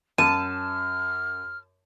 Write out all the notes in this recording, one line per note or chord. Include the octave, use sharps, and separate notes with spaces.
F#2 A5 F6 D#7